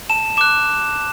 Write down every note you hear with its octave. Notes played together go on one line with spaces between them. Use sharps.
A5 E7
D6 F#6 E7